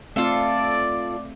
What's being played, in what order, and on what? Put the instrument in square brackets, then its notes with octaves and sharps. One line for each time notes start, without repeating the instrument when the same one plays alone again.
[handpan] A3 C4 F5 [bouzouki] F4 A4 [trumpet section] D5